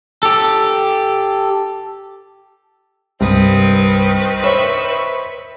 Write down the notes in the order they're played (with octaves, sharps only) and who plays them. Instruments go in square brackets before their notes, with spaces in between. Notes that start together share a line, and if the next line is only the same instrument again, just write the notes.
[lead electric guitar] G4 A4
[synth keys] C2 D#6 [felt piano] G2 [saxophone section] D#3 C4 B4
[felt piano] C5 C#5 [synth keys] E5 B5 C#6